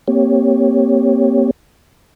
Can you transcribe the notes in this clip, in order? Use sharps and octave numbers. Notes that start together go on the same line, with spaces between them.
A#3 C4 G4 C#5